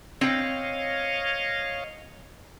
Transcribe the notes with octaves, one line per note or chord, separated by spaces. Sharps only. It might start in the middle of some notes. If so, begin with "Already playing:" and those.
C4 C#5 D#5 F5 G5